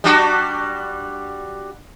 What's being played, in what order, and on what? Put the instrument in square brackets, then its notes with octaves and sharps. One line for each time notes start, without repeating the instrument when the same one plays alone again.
[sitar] G3 D4 F#4